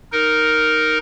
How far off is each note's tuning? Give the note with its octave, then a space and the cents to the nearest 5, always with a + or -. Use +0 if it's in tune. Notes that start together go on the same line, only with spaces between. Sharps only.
D#4 +0 A#4 +0